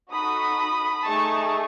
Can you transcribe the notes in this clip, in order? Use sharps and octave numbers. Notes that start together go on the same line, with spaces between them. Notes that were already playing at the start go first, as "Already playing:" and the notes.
D#4 F#4 A4 B5 D#6
A3 D#4 G#4 A5 C#6